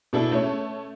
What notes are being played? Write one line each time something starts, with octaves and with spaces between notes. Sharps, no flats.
B2 D4 E4 A4
A3 C#4 C#5